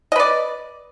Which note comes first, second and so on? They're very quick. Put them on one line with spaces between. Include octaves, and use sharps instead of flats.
D#5 B4 D5